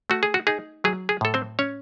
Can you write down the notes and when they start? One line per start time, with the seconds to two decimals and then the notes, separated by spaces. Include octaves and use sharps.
0.10 A3 F#4
0.23 G#4
0.34 F#4
0.47 D#4 G#4
0.84 F#3 G#4
1.09 G#4
1.21 A2 A4
1.34 C4 C5
1.59 C#4 C#5